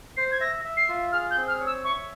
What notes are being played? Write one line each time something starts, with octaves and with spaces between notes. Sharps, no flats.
C5 C7
G#6
E5 A#6
E5
C7
F4
G#4 F6
G6
C4
F6
C#5
E6
E5 C#6